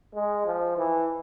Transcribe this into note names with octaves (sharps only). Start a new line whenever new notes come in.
G#3
F3
E3